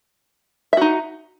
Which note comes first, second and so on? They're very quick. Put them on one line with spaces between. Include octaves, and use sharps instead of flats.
E5 F#4 D#4